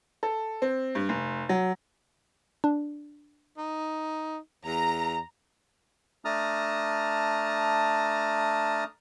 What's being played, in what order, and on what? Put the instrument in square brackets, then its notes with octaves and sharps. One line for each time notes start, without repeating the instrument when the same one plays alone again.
[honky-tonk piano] A4
C4
G2
F1
F#3
[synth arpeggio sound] D4
[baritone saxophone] D#4
[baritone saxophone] E2 [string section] A#5
[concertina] A3 D4 A5 A#5 D#6 F6